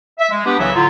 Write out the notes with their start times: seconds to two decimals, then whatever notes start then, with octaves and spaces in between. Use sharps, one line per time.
0.19 E5
0.31 G#3
0.45 B3 D4 G4 B4
0.59 C2 C#3 E3 F#3 C#5 E5
0.75 A2 D3 F#3 E4 F4